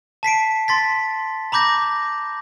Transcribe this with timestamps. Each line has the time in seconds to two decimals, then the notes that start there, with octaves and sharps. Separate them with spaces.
0.23 A5 B6 C7 D7
0.68 C6 A6 B6
1.52 A#5 B5 D6 G6 A#6